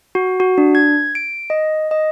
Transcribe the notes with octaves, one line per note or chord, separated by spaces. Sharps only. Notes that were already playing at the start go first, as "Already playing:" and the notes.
F#4
F#4
D4
G#6
D7
D#5
D#5